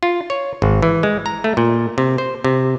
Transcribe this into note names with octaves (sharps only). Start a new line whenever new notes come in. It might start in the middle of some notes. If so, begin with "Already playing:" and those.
F4
C#5
G#1
E3
G#3
A#5
A3
A#2
C3
C5
C3